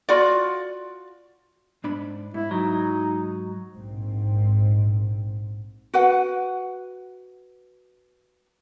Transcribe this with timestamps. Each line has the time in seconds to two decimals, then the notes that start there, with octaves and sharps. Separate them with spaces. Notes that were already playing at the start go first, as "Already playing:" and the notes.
0.09 F4 F#4 D5
1.84 G#2 D4 B5
2.34 G#2 E4
2.51 F#3 D#4
3.75 A#1 G#2 C4
5.94 F#4 B4 F#5